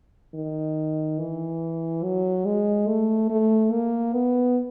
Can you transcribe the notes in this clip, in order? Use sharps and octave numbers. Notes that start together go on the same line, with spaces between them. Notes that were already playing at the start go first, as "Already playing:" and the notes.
D#3
E3
F#3
G#3
A3
A3
A#3
B3